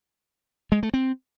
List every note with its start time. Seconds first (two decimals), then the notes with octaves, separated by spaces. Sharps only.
0.72 G#3
0.83 A3
0.94 C4